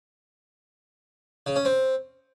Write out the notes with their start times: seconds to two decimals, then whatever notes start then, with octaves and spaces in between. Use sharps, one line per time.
1.46 C#3
1.56 C#4
1.65 C4